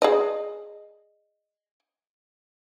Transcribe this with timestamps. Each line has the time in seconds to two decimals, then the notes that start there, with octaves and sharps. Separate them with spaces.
0.02 G#4 D5 D#5